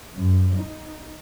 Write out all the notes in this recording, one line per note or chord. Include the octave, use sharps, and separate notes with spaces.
F#2
D#4